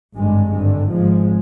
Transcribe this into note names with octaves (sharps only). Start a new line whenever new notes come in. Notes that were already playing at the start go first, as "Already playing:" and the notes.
G#1 G2 D3 G#3
G#1 G2 D3
G#1 G#2 F3 G#3